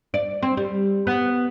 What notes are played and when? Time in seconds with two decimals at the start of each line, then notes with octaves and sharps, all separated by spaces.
0.14 D5
0.43 C4
0.57 G3
1.07 B3